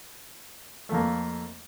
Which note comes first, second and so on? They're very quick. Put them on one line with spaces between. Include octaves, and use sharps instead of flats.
A3 F2 A#3